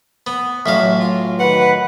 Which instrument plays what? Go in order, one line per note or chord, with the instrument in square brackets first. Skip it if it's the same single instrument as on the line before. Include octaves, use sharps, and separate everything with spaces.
[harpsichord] B3
[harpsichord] A1 F#3 F5 [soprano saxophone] E5
[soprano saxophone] F4
[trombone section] D#3 F#4 B4 [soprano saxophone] F#5